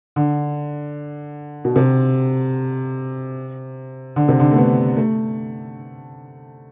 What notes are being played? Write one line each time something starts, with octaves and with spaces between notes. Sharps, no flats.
D3
B2
C3
D3
C3
D3
A3
B3
A3